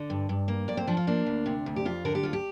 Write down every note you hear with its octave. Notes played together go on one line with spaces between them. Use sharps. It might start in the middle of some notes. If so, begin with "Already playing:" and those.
Already playing: D3 D5
G2
G2
A#3
F2 D5
C4
F3 D4
F4
A#3 D4
D2
C3
D2
G4
F2 F4
D3 A#4
G4
D2 F4
G4